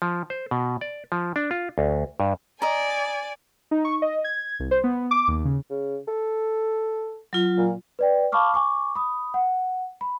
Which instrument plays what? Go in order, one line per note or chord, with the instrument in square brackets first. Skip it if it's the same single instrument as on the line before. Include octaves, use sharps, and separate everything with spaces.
[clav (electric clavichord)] F3
C5
B2
D5
F3
D4
F4
D2
G2
[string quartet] D5 G#5 [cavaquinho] D#5 A#5
[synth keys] D#4
C#6
D#5
G#6
C2
C5
B3
D6
D#2
C#3
[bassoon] C#3
A4
[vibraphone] F#3 F4
[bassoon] A#2
[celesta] B4 D5 G5
F5 A5 B5 C#6 D6 F6
G#5 C#6 D6
B5 D#6
F#5
B5